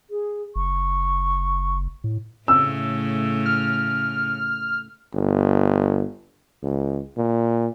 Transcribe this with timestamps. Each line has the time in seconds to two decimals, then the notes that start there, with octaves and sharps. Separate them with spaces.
0.10 G#4
0.56 F#1 C#6
2.04 A2
2.48 A2 C#3 A3 E6
3.46 F6
5.14 G1
6.63 C#2
7.17 A#2